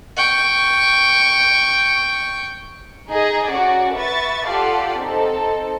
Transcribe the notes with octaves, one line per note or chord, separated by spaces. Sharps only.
G5 C#6
D#4 G#4 D#5 A#5
C#4 F#4 D5
B4 E5 C#6 A6
F4 G4 A4 D5 F5 F#5
C4 D#4 A4